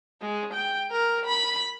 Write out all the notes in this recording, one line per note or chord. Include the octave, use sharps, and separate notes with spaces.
G#3
G5
A#4
B5